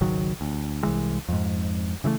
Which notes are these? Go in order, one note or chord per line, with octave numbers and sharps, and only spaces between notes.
G#1 C#2 D#3 F#3
D2
C2 E3 G#3
F2 G#2
C#3 E3 F#3 A3